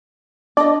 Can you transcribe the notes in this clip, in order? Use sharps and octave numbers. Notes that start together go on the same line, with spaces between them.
D4 D5 D#5